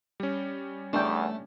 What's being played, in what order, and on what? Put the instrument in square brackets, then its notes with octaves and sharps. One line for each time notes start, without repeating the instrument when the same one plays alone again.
[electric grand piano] G3 C#4
[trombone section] E2 [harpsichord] A3 [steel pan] D4 G5